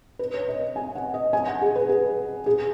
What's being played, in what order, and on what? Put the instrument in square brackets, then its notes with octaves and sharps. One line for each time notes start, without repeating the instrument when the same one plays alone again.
[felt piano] B4
C#5
D#5
G#5
F#5
D#5
G#5
F#5
G#4
B4
G#4
G#4